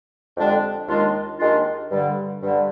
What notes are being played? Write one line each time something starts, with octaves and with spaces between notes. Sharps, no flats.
F2 D3 G#3 D4 G4
D#2 D#3 G#3 D4 F4
D#2 D#3 G#3 D4 F4
G2 D3 G3
G2 D3 G3